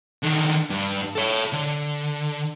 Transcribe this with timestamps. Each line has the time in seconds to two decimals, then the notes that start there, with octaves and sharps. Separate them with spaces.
0.23 D3 D#3
0.70 G2
1.16 A4 C#5
1.53 D3